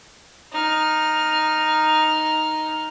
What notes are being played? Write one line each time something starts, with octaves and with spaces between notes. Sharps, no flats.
D#4 F6